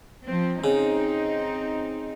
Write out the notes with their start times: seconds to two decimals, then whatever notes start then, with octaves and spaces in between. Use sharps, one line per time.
0.25 F3 C4
0.64 C#3 C4 D#4